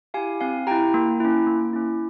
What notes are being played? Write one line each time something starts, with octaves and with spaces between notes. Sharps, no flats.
E4 G4 F5 G#5
C4 F5 G#5
E4 G4 G5 A#5
A#3
C#4 E4
A#3
C#4 E4